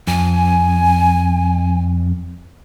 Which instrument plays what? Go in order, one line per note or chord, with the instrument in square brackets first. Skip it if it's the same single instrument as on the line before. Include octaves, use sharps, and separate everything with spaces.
[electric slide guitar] F2 [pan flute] G#5